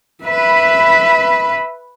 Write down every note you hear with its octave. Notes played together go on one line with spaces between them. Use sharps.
B4 E5 B5